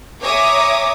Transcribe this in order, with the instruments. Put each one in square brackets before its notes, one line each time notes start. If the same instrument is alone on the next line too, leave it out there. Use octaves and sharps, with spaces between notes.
[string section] C#5 E5 G#5 A#5 D6 D#6